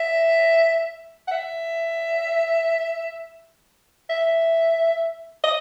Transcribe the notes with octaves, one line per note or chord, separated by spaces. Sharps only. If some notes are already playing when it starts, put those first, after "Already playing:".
Already playing: E5
F#5
E5
E5
D#5